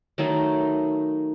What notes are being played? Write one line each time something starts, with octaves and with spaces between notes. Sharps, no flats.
D#3 F#3 A3 D#4